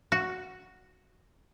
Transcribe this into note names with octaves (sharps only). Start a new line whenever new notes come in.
F#4